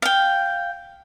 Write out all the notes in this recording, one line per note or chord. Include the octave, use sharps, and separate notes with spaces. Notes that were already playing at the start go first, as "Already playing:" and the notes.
F5 G5